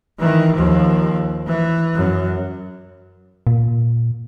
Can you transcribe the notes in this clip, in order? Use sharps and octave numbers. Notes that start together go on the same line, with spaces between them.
D#3 E3
D#2 F3
E3
F#2
A#2